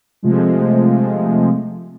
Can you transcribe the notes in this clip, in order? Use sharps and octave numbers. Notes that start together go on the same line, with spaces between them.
C3 F3 G#3 A3